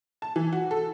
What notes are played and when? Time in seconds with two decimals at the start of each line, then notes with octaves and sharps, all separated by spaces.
0.22 A5
0.36 E3
0.53 F#4
0.71 A4